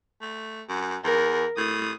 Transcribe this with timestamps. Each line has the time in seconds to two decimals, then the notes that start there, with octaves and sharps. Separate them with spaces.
0.21 A3
0.69 F#2
1.04 E2 A#4
1.57 A2 D#6